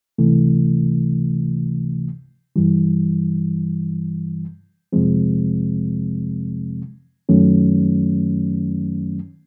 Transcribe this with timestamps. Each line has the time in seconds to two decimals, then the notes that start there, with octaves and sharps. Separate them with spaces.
0.18 C#2 C3 E3 A3
2.56 G2 E3 G3
4.92 F2 C3 F3 G#3 C4
7.29 F#2 D#3 F#3 A3 C#4